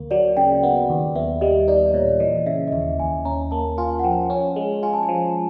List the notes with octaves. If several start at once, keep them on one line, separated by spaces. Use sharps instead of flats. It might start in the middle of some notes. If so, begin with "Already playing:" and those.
Already playing: D2 A#3
F#3 D5
C#3 G5
B3 F#5
D#2
B3 E5
G3 D#5
D#4 D5
A#2 C#5
E3 D#5
C#3 E5
D#5
D#2 E5
D#2 G#5
C#4 A#5
A#3 A5
F4 G#5
F#5
F3 G5
C#4 G#5
G#3
F4 G#5
A5
G#5
F3